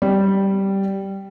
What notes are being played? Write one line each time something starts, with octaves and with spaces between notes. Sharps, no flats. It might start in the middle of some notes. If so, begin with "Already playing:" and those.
G3